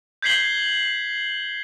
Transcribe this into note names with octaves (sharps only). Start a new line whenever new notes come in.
G6 G#6 B6 C7 F#7 G7